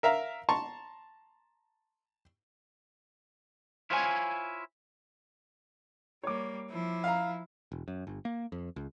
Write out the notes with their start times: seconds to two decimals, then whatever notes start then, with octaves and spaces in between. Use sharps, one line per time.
0.03 A#4 E5 F5 A#5
0.49 A5 A#5 C6 C#6
3.90 E4 F4 C5 C#5 E5 G#5
6.23 G3 A#3 C#5 D6
6.70 F3 E4
7.04 F5 A#5
7.72 E1
7.88 F#2
8.07 G1
8.25 A#3
8.52 F2
8.76 C#2